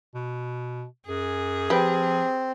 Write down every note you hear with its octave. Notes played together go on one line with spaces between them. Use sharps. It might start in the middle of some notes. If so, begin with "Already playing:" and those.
B2
F#2 G#4
F3 C4 G4 B4